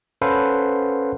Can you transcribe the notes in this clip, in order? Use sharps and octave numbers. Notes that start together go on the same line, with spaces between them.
C#4 A4 B4 C5 F5 F#5